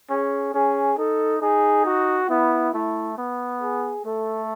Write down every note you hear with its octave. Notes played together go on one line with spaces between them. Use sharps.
C#4 G#4
C#4 G#4
D#4 A4
D#4 G#4
F#4
B3 E4
A3 E4
B3
G#4
A3 A4